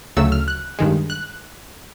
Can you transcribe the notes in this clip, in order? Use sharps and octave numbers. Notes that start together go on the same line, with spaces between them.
D2 C#3 F#3 A3 E6
F6
F#6
G2 D#3 G#3
F#6